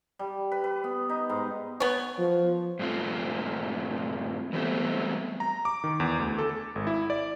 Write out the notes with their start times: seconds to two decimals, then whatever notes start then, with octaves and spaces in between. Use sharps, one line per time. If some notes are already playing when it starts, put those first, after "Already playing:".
0.19 G3
0.52 B4
0.64 B4
0.84 B3
1.09 D#4
1.30 G#2
1.80 B3 C#5
2.19 F3
2.79 G2 A#2 A3 C4 F4
4.53 E3 F#3 G3 A3 B3 C4
5.40 A#5
5.65 D6
5.84 D#3
6.00 E2
6.20 D2
6.38 A4
6.50 A4
6.75 G#1
6.87 E4
7.10 D5